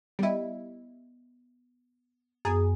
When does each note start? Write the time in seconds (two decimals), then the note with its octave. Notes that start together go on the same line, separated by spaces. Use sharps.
0.19 G3 B3 E4 D#5
2.45 F#2 B3 G#4